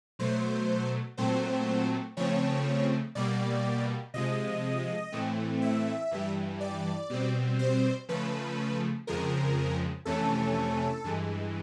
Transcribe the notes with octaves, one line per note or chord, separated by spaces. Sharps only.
B2 F#3 A3 C5
A#2 F#3 A3 C4 C5
C#3 F3 A3 C4 C#5
B2 G3 A#3 D5
C3 F3 G#3 D#5
A2 E3 A3 C4
E5
G2 E3 G3
D5
B2 G3 C4
C5
C#3 F3 A3 B4
F2 C#3 F3 G#3 A#4
F2 C3 E3 A3 C#4 A4
G2 E3 G#3